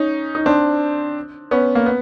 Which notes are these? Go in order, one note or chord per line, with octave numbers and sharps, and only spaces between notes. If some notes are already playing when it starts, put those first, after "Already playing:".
Already playing: C#4 D#4
D#4
C4 D4
B3 C#4
A#3
B3